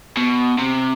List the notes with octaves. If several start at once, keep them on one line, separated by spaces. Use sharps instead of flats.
B2
C3